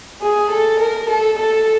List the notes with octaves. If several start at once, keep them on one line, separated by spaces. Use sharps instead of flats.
G#4
A4
A#4
A4
A4